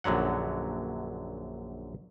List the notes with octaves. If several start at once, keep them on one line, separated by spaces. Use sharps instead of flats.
A#1 F#2 D3 F#3 F#5